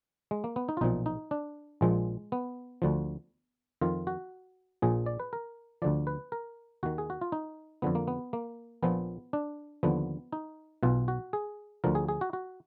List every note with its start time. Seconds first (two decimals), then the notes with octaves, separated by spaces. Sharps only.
0.31 G#3
0.44 A#3
0.56 B3
0.69 D#4
0.77 F4
0.81 B1 A#2 F3 D#4
1.06 D#4
1.31 D4
1.81 A#1 A#2 F3 G#3
2.32 B3
2.82 D2 D3 F3
3.81 F2 D#3 F4
4.07 F#4
4.82 A#1 A#2 F3 G#4
5.06 D5
5.20 B4
5.33 A#4
5.82 D2 D3 F3 D5
6.07 B4
6.32 A#4
6.83 D#2 D#3 F#4
6.98 G#4
7.10 F#4
7.21 F4
7.32 D#4
7.82 F2 D3 F3 B3
7.95 A#3
8.08 B3
8.33 A#3
8.82 A#1 A#2 F3 B3
9.33 D4
9.83 D#2 D3 F3 B3
10.32 D#4
10.83 B1 B2 F4
11.08 F#4
11.33 G#4
11.84 D2 D3 F3 A#4
11.95 G#4
12.08 G#4
12.21 F#4
12.33 F#4